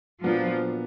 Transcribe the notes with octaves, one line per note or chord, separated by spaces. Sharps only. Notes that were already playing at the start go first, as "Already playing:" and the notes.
A#2 F3 F#3 B3 D4